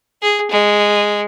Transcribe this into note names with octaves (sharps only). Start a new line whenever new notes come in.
G#4
G#3